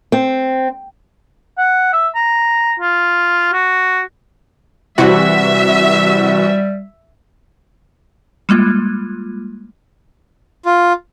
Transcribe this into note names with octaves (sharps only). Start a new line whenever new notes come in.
C4
F#5
E5
A#5
F4
F#4
C3 E3 G3 F#4 E5
G3 G#3 A#3 F4
F4